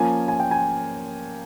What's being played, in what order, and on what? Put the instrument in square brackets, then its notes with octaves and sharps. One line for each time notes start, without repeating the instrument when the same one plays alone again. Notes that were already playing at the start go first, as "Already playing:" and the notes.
Already playing: [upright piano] F3 A#3 C#4 [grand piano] G#5
[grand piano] G#5
G5
G#5